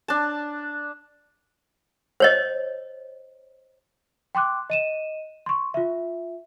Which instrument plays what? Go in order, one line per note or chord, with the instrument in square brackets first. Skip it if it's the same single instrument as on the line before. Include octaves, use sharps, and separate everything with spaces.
[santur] D4 A5
[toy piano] C5 C#5 D#5
[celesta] G5 C6 D6 F#6
D#5 D#7 E7
C6 C#6
F4 E5